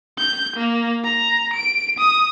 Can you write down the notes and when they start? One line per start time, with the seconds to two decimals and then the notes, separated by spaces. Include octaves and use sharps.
0.18 G6
0.56 A#3
1.04 A#5
1.54 D7
1.99 D#6